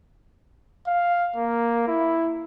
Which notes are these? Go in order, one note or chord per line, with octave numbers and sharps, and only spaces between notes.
F5
A#3
E4